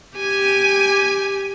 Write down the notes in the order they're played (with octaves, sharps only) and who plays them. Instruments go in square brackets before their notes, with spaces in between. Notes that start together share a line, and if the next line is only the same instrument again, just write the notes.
[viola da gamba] G4 [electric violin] G#5